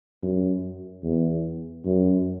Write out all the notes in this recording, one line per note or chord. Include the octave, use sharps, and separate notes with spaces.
F#2
E2
F#2